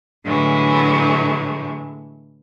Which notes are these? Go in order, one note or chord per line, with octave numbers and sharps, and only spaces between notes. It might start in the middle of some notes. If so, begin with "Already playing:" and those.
A2 D3 E3 F#3 G#3 A3